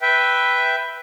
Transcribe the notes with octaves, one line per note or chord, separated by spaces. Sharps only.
B4 E5 G5